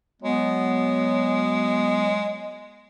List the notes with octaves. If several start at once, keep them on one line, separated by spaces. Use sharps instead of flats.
F#3 G#3 B3